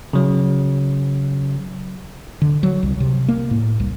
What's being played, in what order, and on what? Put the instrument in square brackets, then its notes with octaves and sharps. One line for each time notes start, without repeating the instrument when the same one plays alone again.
[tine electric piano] C#3 F#3
[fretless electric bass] D3
F#3
C2
C3
A#3
A2
C2